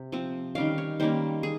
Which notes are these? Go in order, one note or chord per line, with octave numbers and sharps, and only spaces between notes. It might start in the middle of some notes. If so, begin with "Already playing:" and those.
Already playing: C3
F3 C4
D#3 G3 C#4 F5
C#5
D#3 G3 A#3 C#4 C5
G#4